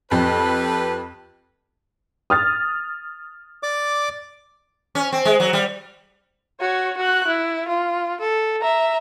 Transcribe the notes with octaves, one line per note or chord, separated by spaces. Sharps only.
F2 G4 A4 B4
D#6 F6 A6
D5 D6
C#4
C4
G#3
F#3
G3
F#4 C#5
F#4 F#6
E4
F4
A4
E5 A#5